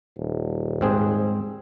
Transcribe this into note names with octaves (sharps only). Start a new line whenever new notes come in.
D#1
G#2 C4 G#4